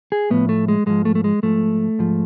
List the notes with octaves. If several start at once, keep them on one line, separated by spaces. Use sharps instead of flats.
G#4
A2 F3 B3
A3
G#3
G#2 F3 G#3
A3
A3
G#3
G#2 F3 A3
G#2 F3